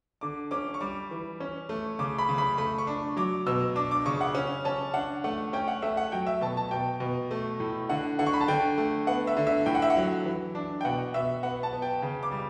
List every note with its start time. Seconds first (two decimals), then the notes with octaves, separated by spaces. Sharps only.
0.21 D3 D6
0.51 C#4 D6
0.74 C#6
0.80 G3 D6
1.11 E3
1.40 C#4
1.69 A3
1.99 C#3 D6
2.18 B5
2.29 C#3
2.38 B5
2.58 A3 B5
2.78 C#6
2.87 D4
3.16 F#3 D6
3.46 B2 E6
3.76 D4 D6
3.91 D6
4.06 C#3 C#6
4.21 F#5
4.35 C#4
4.65 C#4 A5
4.94 D4 F#5
5.24 A3 F#5
5.53 C#4 G5
5.68 F#5
5.82 A3 E5
5.97 F#5
6.12 F#3 G5
6.27 E5
6.41 B2 A5
6.57 A5
6.71 B2 G5
7.00 B2
7.31 A3
7.60 A2
7.89 D3 F#5
8.19 D3 F#5
8.26 C#6
8.33 B5
8.40 A5
8.48 D3 G5
8.78 A3
9.07 B3 F#5
9.27 E5
9.37 D3
9.47 E5
9.66 A2 G5
9.75 F#5
9.82 E5
9.90 F#5
9.96 F#3
10.25 E3
10.55 D4
10.81 G5
10.85 B2 F#5
11.14 B2 E5
11.43 B3 F#5
11.63 A5
11.73 B3
11.82 G5
12.02 C#3
12.23 D6
12.31 G3